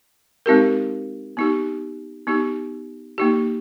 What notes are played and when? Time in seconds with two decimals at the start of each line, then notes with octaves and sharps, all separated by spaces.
0.46 G#3 C4 D#4 G4 A#4
1.37 B3 D#4 G4
2.27 B3 D#4 G4
3.18 A#3 D#4 G4